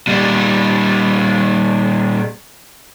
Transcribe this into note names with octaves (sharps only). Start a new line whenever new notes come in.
A#2 G3